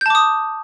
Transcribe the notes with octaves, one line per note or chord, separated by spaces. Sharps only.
A5 D6 D#6 G6